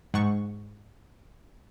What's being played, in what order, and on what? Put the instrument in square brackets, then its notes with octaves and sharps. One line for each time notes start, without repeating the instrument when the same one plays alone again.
[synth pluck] G#2 F#5 C#6